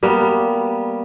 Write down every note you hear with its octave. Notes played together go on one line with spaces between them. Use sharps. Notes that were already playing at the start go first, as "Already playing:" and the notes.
G3 A#3 B3